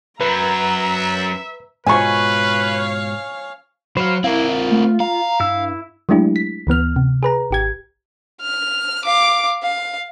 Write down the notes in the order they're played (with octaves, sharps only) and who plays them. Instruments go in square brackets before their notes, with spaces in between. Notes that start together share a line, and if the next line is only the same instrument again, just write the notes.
[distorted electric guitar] F#2 F#3 [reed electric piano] B4 [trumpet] E5 [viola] A#5
[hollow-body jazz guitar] G#2 B2 F4 [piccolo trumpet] B4 [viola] C#5 F5 [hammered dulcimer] G#5 C#6
[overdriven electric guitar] F#3 [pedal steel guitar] C5 F5 [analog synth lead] B5
[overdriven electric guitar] C4 A#4 [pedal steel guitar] E4 [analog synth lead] F5
[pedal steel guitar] F4
[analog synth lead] A3
[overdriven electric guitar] F5 [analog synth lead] A#5
[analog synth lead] G2 [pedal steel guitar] E4 E6
[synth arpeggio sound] F#3 G#3 A3 D4 E4 G4
B6
D2 E3 B3 F6
C3
G#4 B4 A#5
G#1 G4 G#6
[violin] F6
F5 D6
F5